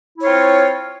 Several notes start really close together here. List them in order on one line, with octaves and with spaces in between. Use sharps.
E4 C#5 F4 C4